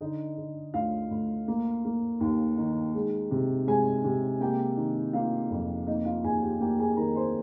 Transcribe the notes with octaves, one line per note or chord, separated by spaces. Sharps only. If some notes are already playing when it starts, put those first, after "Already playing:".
D3 D#4 D#5
D3
D2 F4 F5
D2
A#3
A#3
D#2
D#3
G#3
C3
G#3 G#4 G#5
C3
A#3 G4 G5
D#3
A#3 F4 F5
F2
A#3 D#4 D#5
F4 F5
D#2 G#4 G#5
G4 G5
A#3 G4 G5
G#4 G#5
D#3 A#4 A#5
C5 C6